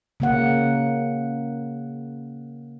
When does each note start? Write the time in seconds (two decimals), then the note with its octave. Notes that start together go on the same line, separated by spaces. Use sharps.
0.20 C#3 A#3 F#5